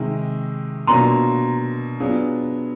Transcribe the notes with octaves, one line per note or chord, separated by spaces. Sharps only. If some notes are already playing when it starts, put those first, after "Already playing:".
Already playing: C3 D#3 G#3
B2 F#3 A#3 D4 F4 A#5 C6
F#3 B3 D4 F4 G#4